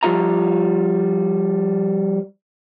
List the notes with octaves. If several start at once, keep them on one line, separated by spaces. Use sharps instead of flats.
F3 G3 F4 E5 A#5